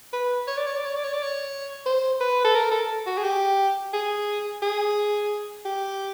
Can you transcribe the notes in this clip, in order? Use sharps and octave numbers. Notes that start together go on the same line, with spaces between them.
B4
C#5
D5
C#5
D5
C#5
D5
C#5
D5
C#5
C5
B4
A4
A#4
A4
F#4
G#4
G4
G#4
G#4
G4